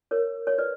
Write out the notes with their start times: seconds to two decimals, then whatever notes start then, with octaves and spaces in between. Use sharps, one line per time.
0.11 A#4 C#5
0.47 C#5
0.58 B4 D5